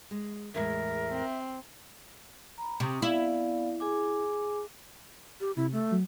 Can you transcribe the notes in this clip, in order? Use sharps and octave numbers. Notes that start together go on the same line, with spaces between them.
G#3
E2 A2 G#3 A#4 E5
C4
A#5 B5
C3 C#6 D#6
B3 E4 D5 F5
G#4 G#5 D6
G4
C3 E4
A3
F#3